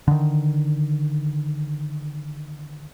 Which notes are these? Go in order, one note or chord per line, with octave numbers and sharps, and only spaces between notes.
D3 D#3